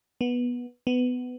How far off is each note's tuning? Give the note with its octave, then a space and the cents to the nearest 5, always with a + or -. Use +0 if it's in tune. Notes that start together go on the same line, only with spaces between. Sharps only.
B3 -15
B3 +15